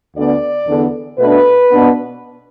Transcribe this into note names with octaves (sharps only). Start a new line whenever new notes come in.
D2 D3 B3 D4 D5
E2 D3 B3 D4
B2 A3 D4 B4
B2 B3 D4